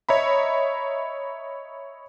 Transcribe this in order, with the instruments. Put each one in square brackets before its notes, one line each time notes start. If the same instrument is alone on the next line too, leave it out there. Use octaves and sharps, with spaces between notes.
[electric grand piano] C#5 D#5 E5 A#5 B5